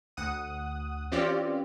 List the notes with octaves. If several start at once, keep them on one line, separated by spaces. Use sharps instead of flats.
D2 F#5 D#6
E3 C4 C#4 F4 G4 D5